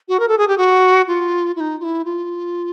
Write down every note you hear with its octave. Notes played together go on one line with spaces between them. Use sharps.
F#4
A#4
A4
G#4
G4
F#4
F4
E4
D#4
F4
E4
F4